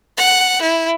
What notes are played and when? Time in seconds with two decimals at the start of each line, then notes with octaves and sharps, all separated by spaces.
0.17 F#5
0.62 E4